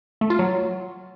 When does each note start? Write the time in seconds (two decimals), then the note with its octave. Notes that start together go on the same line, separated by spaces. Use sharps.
0.21 A3
0.30 F4
0.39 F#3